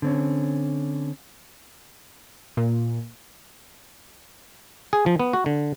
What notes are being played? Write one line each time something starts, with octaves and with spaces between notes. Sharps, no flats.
D3 C4 C#4
A#2
G#4
F3
B3
F#4
D3